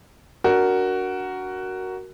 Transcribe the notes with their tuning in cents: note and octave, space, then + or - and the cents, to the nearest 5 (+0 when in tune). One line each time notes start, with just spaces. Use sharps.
D4 -20 F#4 +10 A#4 +0